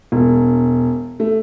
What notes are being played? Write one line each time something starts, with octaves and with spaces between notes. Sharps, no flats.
E1
A3